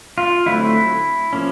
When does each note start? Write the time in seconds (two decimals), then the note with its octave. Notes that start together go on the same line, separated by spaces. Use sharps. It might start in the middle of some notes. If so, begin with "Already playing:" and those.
0.18 F4
0.46 D3 F#3 A3 C4 E4
1.33 F3 A#3 C#4